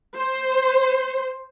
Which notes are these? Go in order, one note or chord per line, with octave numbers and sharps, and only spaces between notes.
C5